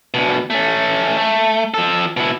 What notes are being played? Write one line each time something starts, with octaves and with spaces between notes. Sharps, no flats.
D2 B2
A3 C#4
A3
F3 A4
B2 E4